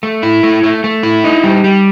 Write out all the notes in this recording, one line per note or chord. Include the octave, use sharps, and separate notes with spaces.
A3
E4
A3
A3
A3
E4
D#4
G3
G3